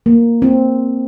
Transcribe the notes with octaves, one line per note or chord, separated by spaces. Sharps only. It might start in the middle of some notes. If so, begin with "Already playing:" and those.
A#3
C4